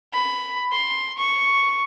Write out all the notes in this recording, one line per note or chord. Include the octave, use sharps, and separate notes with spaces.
B5
C6
C#6